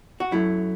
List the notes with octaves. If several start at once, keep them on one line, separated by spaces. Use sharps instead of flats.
F#4
F#2 F#3 A3 E4